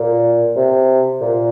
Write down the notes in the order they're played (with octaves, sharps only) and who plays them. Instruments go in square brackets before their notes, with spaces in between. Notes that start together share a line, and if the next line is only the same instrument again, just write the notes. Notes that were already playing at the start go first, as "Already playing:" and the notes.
Already playing: [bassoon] A#2
C3
A#2